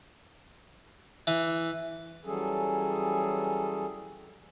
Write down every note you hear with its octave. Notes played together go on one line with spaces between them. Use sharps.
E3
E3 F#3 G3 C#4 G#4 A4